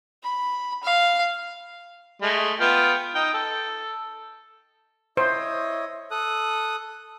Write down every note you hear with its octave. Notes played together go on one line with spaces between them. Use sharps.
B5
F5
G#3 A3
B3 F4 G5
D#4 G5
A4
E4 C5 C#5 D#5
A4 D#6 F#6